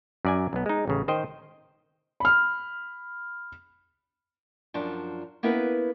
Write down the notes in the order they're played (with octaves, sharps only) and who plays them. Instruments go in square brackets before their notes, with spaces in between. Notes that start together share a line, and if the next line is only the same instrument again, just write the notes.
[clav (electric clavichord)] F#2 D5 G#5
B1 B3
G#3 D#4
A1 C#3
D#3 C5 D#5 G5
[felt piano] B5 F6
[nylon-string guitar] F#2 F3 D4
A#3 B3 C#4 E4 A#4 B4